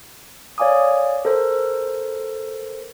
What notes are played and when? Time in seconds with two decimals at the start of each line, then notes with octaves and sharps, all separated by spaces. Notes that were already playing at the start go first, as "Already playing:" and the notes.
0.58 C#5 D5 F5 G#5 D6 D#6
1.25 A4 A#4 C5